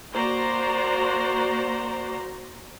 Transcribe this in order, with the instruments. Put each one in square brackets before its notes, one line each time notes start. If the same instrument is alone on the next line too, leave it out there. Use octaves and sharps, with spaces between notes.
[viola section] A#3 F#4 C5 D5 A#5